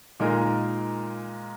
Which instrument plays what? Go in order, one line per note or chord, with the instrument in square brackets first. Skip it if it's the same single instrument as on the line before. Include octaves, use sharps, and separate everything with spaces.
[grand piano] A#2 G#3 D#4 A#4